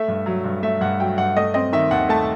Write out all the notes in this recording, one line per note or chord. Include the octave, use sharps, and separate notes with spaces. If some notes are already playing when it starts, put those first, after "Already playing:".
Already playing: A3 E5
G2
F#3
G2
A3 E5
G2 F#5
F#3 G5
G2 F#5
A3 D#5
C4 D#5
D#3 E5
D#2 F#5
A3 A5